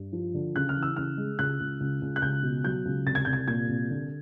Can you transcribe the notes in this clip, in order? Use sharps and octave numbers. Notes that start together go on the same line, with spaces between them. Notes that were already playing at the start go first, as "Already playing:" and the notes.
Already playing: G2
F3
D3
C#3 F#6
F6
E3
E6
C#3 F6
G#3
C#2 F#6
C#2
C#2
C#2
F#6
C#2 G6
B2
F#3 G6
C#2
C2 A6
G#6
C2 G6
G#6
A#2 G#6
C2
D3